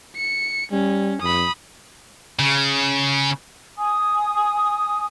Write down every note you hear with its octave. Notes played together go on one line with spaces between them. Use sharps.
C#7
G3 C#4
F2 B5 D#6
C#3
G#5 D#6